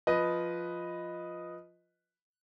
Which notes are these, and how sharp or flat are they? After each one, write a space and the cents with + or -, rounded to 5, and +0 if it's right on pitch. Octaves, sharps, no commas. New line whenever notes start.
F3 +0 B4 +0 D#5 +0